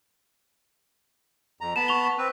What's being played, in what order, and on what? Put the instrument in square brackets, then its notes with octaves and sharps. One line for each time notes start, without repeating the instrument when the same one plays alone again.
[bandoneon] F2 A#5
[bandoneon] B3 A5 B5 [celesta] E7
[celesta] C#6 F7 G7
[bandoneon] C4 B4